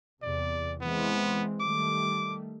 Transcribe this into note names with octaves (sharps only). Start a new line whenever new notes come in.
E2 C3 D5
E3 G#3 B3 C4
D#3 G3 A3 D6